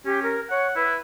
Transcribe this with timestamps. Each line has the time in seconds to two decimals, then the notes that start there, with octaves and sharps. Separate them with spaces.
0.05 C#4 G4
0.23 A#4
0.50 C#5 F#5
0.76 E4 B4